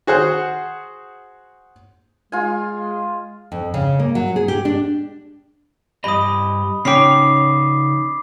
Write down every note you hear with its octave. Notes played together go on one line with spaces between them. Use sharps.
F#4 G#4 C5 F#5
G#3 F4 G#5
F2
C#3
A#3
F#3
G#4
G4
D4
G2 G4 D#5 B5 D#6
C#3 C#4 D#4 C#5 G5 D6 B6 C7